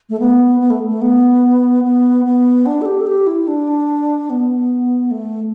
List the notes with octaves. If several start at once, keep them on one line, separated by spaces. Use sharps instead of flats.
A3
B3
B3
A3
A3
B3
B3
B3
D4
A4
G4
A4
G4
E4
D4
B3
A3